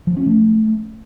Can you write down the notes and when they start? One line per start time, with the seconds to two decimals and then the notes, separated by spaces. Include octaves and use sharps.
0.07 F3
0.17 C#4
0.26 A3